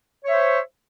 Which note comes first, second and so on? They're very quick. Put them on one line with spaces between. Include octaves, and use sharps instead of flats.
C#5 E5 C5